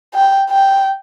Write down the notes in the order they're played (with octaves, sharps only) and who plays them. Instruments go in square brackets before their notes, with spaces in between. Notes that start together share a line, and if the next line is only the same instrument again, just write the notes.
[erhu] G5
G5